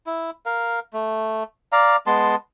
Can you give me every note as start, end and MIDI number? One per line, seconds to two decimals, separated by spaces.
0.06 0.30 64
0.46 0.80 70
0.46 0.80 77
0.93 1.43 57
1.72 1.96 74
1.72 1.96 77
1.72 1.96 82
2.07 2.35 56
2.07 2.35 59
2.07 2.35 81
2.07 2.35 84